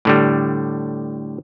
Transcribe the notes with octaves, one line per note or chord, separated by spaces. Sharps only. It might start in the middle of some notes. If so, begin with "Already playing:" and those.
A2 D3 G3